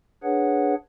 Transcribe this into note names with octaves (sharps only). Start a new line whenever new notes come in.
D4 G#4 B4 C#5 F#5